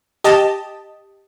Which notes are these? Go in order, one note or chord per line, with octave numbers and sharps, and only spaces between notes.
G4 D#5 A5